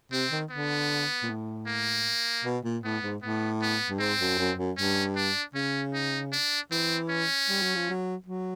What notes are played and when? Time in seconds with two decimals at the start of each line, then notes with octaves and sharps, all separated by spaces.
0.12 C3 C4
0.31 D#3
0.50 D3 B3
1.23 A#2
1.29 A2
1.67 A#3
2.44 B2
2.64 A#2
2.84 A2 B3
3.03 G#2
3.23 A2 B3
3.62 B3
3.89 G2
3.99 G#2 C4
4.20 F#2
4.38 F#2
4.58 F#2
4.77 G2 C#4
5.16 D4
5.54 C#3 C#4
5.93 D#4
6.33 D4
6.71 E3 C4
7.10 C#4
7.49 G3
7.62 F#3
7.76 F3
7.90 F#3
8.26 F#3